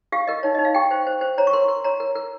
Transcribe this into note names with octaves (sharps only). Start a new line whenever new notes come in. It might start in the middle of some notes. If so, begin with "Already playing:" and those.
G4 F5
A#4 D#5
D#4 C#5
D#5
D#4
F5
G4 G5
C5
C5
C5
C#5 A#5
C#6
A#4 C6
A#4
C#5 A#5
A#4
A#4